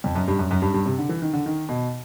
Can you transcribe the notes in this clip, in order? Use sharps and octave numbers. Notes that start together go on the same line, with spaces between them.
F2
F#2
G2
F#2
F#2
G2
G2
C3
D3
E3
D#3
D3
D#3
B2